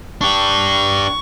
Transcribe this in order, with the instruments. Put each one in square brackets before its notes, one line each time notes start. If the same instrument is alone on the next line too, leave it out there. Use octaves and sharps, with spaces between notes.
[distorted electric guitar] D4 G4 [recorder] C#6